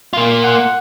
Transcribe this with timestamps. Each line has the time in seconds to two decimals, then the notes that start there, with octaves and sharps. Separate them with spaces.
0.13 A#3 F4
0.44 F#5